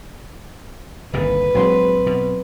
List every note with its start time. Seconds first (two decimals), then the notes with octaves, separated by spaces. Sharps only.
1.13 G1 C2 A#2 D#3 B4
1.55 A#1 F#3 G#3 C4 C6
2.07 B2